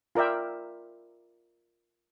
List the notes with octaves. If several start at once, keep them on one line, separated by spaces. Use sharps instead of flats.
F4 A#4 D5 E5 G5